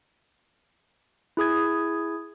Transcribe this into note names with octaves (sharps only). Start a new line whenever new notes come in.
E4 G#4 D#6 G#6